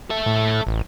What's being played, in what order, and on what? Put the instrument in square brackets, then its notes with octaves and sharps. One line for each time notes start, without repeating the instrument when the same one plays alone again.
[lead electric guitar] A4 E5
[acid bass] A2
A1